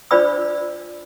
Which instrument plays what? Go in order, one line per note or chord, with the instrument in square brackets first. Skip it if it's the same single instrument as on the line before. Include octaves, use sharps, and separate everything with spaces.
[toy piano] D4 F4 C5 D5 B5 E6